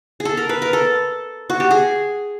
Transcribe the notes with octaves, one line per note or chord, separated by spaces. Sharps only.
G#4
A4
A#4
B4
A#4
A4
F#4
G4
G#4